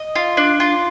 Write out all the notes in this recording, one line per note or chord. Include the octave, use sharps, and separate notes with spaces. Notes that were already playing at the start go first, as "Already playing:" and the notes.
Already playing: D#5
F4
D4
F4